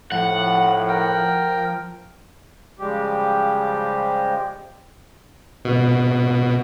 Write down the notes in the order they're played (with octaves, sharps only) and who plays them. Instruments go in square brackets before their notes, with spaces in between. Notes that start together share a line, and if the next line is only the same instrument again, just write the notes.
[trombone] A2 [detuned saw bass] F3 [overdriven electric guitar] F#5
[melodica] A#4 G5
[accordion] C#3 F3 G3 G#3 G4
[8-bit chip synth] B2